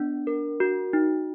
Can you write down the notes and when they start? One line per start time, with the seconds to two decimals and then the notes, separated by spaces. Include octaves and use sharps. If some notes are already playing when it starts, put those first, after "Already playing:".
Already playing: B3 D4
0.27 A#4
0.60 F#4
0.93 D#4